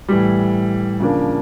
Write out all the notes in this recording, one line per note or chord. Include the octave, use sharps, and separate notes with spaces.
A2 E3 G3
C#3 F3 A#3 D4